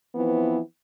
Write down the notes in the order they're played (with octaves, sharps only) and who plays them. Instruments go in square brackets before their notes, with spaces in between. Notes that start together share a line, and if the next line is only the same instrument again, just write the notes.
[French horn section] E3 F3 B3 C4 E4